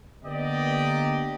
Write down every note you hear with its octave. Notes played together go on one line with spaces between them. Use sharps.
D3 A#3 B3 G4 D5 D#5